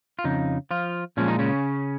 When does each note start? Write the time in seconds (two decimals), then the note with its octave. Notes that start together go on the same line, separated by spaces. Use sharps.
0.19 F4
0.24 F2 C#3 D#4
0.71 F3 F4
1.17 A#2 F3 G#3 C#4
1.28 D#4
1.39 C#3 C#4